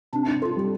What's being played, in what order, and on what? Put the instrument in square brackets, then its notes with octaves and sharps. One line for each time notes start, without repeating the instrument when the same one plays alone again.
[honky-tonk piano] C3 [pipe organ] D4
[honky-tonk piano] D4
[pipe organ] F4 [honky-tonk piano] A4
[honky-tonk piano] G3